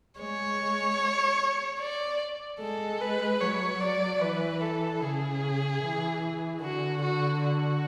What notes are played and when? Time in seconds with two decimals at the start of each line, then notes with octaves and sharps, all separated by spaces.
0.20 G#3 C#5
1.80 D5
2.61 G#3 A4
3.01 B4
3.41 F#3 C#5
3.80 D5
4.21 E3 B4
4.61 A4
5.01 C#3 G#4
5.82 E3
6.62 D3 F#4
7.02 F#4
7.42 F#4